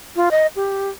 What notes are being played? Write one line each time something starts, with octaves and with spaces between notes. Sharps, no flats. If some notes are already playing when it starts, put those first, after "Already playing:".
F4
D#5
G4